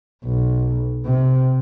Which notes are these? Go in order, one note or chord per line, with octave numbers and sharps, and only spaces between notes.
B1
C3